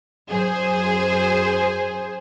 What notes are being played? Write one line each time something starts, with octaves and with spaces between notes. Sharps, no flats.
F#2 G#4 C5